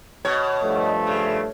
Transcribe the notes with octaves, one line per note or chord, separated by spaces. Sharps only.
B2 C#5
G2 F3 A3
C#3